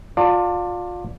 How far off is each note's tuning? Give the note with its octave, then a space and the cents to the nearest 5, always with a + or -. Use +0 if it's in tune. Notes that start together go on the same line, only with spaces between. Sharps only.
F4 +25 D5 +5 A5 +30